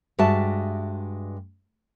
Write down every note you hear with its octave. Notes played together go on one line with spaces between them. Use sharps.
G2 G#3 F#4 E5 A5